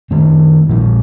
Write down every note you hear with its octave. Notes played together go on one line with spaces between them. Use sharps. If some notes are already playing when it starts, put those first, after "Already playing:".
D#3 A3 C4
A#2 F3 C4